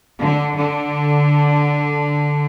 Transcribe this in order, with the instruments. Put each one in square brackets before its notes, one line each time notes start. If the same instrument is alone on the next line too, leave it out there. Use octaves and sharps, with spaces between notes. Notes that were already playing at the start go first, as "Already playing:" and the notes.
[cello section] D3
D3